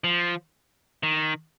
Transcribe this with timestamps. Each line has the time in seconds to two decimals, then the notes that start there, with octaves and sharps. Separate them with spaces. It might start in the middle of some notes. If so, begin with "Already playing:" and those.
0.04 F3
1.03 D#3